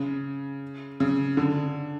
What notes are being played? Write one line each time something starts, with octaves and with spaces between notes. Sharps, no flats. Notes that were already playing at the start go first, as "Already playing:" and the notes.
Already playing: C#3
C#3
D3